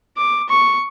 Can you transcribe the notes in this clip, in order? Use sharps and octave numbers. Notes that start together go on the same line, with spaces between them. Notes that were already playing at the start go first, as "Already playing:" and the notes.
D6
C#6